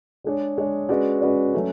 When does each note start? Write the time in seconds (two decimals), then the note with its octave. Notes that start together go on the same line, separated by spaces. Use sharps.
0.24 G#3 D4 G#4 C#5
0.57 G#3 D4 G#4 C#5
0.89 G#3 C#4 F#4 B4 D5
1.21 G#3 C#4 F#4 B4 D5
1.54 F#3 A3 C#4